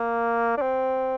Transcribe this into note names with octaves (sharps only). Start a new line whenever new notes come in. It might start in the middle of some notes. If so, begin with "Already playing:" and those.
Already playing: A#3
D4
C4